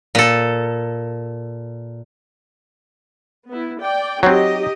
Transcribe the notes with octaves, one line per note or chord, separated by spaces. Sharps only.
A#2 A4
B3 E4
D5 G5
F#3 C4 D#4 G4 D#5